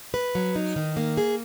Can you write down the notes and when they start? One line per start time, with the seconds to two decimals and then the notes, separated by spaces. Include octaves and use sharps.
0.14 B4
0.35 F#3
0.56 D#4
0.76 D#3
0.97 A#3
1.17 G#4